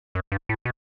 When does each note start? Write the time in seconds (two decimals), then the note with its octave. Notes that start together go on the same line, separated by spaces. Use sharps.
0.15 F#2
0.32 G2
0.49 A2
0.65 B2